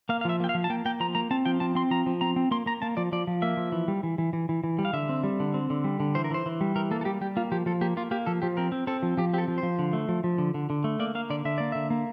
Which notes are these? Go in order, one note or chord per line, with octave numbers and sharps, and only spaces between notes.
A#3 F5
F5
F3 E5
A#3 G5
F5
F3
A5
A#3 G5
A#3 G5
F3 A#5
A#3 A#5
C4 A5
F3 G5
C4 A5
C4 C6
F3 A#5
F3
C4 A#5
C4
A#3 C6
A#3 A#5
A#3 A5
F3 D5
F3 D5
F3
A#3 E5
F3
E3
G3
E3
E3
E3
E3
E3
G3
F5
D3 E5
C4
G3
D3
C4
D3
G3
D3
E3 C5
A#4
E3 C5
E3
G3
E3 A#4
A#3 A4
A4
G3 G4
G3 G4
A#3 F4
F3 G4
F3 A4
A#3 G4
A#3 F4
A#3 G4
F3 A4
F3 G4
C4 A#4
C4
C4 A4
F3
F3 G4
C4 G4 A4
F3
C5
F3
D3
A3
F3
F3
D3
D3
D3
A3
A#3 D5
A#3 F5
D3 D5
D3 E5
A#3 D5
D3 E5
A#3